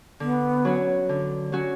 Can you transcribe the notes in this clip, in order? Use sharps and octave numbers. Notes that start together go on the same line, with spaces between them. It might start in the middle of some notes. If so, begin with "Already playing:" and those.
D3 B3
F#3 C#4 F#4
D3
F#3 C#4 F#4